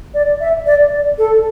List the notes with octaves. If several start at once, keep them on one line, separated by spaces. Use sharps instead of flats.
D5
E5
D5
D5
A4